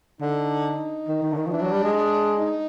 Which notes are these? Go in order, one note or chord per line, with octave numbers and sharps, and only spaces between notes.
D3 D#4
D#3
D#3
D3
D#3
F3
E3 D4
F#3
G3
G#3
D4
D#4